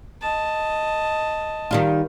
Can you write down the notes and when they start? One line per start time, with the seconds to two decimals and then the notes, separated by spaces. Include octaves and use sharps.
0.21 D#5 A5
1.71 D#3 G3 F4